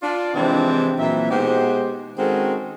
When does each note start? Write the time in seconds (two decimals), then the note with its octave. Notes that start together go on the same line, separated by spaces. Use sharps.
0.03 D4 F4 D5
0.35 C3 E3 F3 G#3 C4 D4
0.99 A#2 E3 F#3 C4 E5
1.30 B2 G#3 D#4 F#4 G4 C5
2.18 D#3 G#3 C4 C#4 F#4 A4